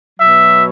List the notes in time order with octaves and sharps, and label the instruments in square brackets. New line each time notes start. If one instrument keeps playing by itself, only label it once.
[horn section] B2 F#3 E5